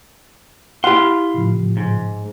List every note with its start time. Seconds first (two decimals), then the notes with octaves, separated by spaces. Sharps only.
0.84 E4 G4 F5 F#5 C6
1.34 A2 C#3 F3
1.77 G#2